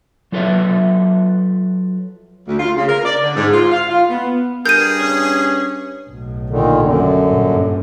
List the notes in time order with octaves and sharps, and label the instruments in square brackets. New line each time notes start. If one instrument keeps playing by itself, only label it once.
[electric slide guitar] F#3 F4 A4 B4 C#5 E5
[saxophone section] D2
F4
C#3
A#4
D5
D3
G#2
F4
F5
F4
B3
[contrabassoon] G2 [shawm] G#4 [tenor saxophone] A#4 [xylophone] G6 D#7
[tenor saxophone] C#4
[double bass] B1 A2
[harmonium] A#2 D3 D#3
F#2 D3
[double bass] G2 A#2